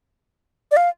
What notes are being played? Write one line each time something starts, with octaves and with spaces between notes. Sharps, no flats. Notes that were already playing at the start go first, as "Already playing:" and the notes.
D5
F5